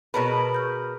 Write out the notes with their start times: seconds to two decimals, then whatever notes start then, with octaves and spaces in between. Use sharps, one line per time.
0.14 B2 G#4 A#4 B4 C#5 A5
0.54 C#6 F6 G6